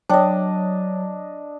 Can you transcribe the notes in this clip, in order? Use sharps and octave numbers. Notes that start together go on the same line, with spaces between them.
F#3 D4 C#5 D#5 G5